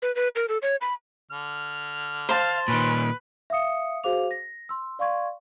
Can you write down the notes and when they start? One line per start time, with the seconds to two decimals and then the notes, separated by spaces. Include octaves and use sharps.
0.02 B4
0.15 B4
0.36 A#4
0.49 A4
0.62 C#5
0.81 B5
1.31 D3 F6
2.29 C5 F5 A5
2.68 A#2 D#3 C#4 B4
3.50 E5 F5 D#6 C#7
4.04 F#4 G#4 C5 F5 D6 F7
4.31 A#6
4.69 C6 E6
4.99 D5 F5 C6 C#6 G#6